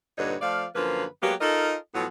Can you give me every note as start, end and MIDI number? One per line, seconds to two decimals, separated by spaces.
0.18 0.36 43
0.18 0.36 46
0.18 0.36 50
0.18 0.36 63
0.18 0.36 71
0.18 0.36 73
0.42 0.65 53
0.42 0.65 57
0.42 0.65 74
0.42 0.65 77
0.75 1.05 42
0.75 1.05 50
0.75 1.05 53
0.75 1.05 58
0.75 1.05 71
1.23 1.34 54
1.23 1.34 56
1.23 1.34 58
1.23 1.34 59
1.23 1.34 67
1.41 1.76 63
1.41 1.76 65
1.41 1.76 69
1.41 1.76 70
1.41 1.76 75
1.95 2.06 45
1.95 2.06 53
1.95 2.06 54
1.95 2.06 59